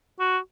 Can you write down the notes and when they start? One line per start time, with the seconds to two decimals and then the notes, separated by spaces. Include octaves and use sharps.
0.19 F#4